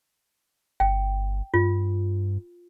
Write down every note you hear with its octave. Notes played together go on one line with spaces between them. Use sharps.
G1 G5
G2 F4